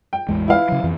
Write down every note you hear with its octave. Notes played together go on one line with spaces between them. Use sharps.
G5
A1 E2 G#3
E4 B4 F5
C#3 F#3
F2 E3